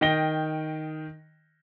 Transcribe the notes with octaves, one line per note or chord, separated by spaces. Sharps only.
D#3 D#5 G5 A#6 G7